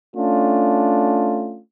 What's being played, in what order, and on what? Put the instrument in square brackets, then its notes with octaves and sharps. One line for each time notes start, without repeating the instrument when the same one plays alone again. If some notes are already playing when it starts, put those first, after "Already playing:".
[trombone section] A3 C#4 D4 F4